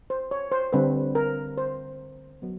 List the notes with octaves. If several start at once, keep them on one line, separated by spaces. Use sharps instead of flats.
C5
C#5
C5
D3 G3 C4 B4
A#4
C5
F#3 B3